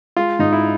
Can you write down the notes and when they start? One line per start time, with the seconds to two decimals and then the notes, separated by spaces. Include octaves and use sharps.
0.17 G#3 F4
0.39 G#2 D#4
0.53 E4